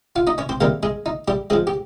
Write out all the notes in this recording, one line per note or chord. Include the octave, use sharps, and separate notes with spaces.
F4 F5
D#4 D#5
C#4 C#5
C4 C5
C3 D#3 G3 A#3 A#4
G#3 G#4
D#4
G3 G4
F3 G#3 C4 G#4
G4